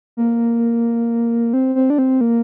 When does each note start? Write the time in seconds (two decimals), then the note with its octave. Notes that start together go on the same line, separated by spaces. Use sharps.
0.17 A#3
1.53 C4
1.75 C4
1.90 D4
1.98 C4
2.21 A#3